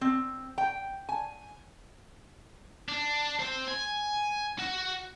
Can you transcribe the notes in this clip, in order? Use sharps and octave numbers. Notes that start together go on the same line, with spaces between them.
C4
G5
G#5
D4
C4 C5
G#5
F#4